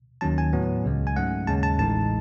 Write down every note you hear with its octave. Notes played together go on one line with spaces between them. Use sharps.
D#2 D#3 F#3 C#4 A5
G#5
A2 F#3 B3
C#2 C#3 G#3
G#5
G#2 F#3 A3 C#4 F#5
D#2 C#3 G#3 C#4 A5
A5
A1 A2 G#3 D#4 A5